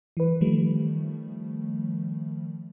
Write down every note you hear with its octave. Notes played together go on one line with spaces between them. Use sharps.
E3 B4
D#3 F3 G3 A3